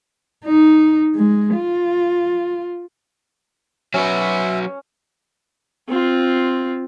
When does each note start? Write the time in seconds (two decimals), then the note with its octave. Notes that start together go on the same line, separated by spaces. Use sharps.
0.45 D#4
1.15 G#3
1.55 F4
3.94 F#3 C#4 F#4 B4 E5
5.88 C4 F4